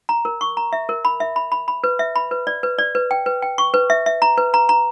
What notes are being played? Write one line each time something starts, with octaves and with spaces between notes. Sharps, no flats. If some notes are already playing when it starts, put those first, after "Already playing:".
A#5
A#4
C#6
A#5
E5
A#4
B5
E5
B5
B5
B5
B4
E5
B5
B4
D5
B4
D5
B4
G5
B4
G5
C#6
B4
E5
E5
A#5
B4
A#5
A#5